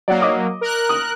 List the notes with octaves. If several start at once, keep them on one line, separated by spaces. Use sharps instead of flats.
F#3 A#3 D5 F#5
D#5 D6 D#6
A#4 F#6
D#6